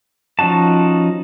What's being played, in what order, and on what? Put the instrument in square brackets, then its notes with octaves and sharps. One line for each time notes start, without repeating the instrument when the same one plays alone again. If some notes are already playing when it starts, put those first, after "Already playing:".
[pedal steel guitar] F3 C#4 D#4 F#4 A5